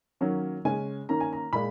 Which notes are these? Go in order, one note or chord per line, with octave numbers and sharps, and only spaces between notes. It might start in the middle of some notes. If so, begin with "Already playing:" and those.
D#3 F#3 A#3 C#4
C#3 G#3 C#4 G#5
D#3 A#3 C#4 A#5
G#5
A#5
A#2 G#3 B5